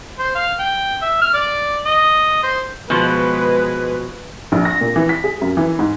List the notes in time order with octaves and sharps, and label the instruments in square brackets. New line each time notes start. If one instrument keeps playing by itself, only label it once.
[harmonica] C5
F5
G5
E5
F6
D5
D#5
C5
[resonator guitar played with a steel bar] B2 F3 [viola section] G#3 B4
[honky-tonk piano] A#1
A#6
A#2
E3
B6
G#4
F#2
E3
G#2